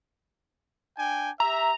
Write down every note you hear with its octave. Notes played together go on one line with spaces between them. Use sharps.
D4 G5 G#5
G4 E5 A#5